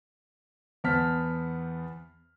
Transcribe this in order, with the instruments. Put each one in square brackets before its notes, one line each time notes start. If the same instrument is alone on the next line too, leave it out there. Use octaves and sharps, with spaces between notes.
[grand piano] E2 B3 C5 A5 F6 B6